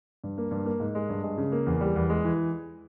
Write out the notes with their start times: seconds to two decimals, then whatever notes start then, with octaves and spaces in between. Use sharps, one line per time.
0.24 G2
0.38 A#3
0.51 G2
0.66 A#3
0.80 G#2
0.95 G#3
1.09 G2
1.23 G#3
1.38 C#3
1.52 A#3
1.67 E2
1.81 G3
1.96 E2
2.10 G#3
2.24 E3